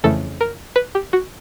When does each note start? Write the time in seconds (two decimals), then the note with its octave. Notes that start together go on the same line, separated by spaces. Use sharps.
0.04 F2 C#3 E3 A3 A4
0.41 A#4
0.76 B4
0.95 G4
1.13 F#4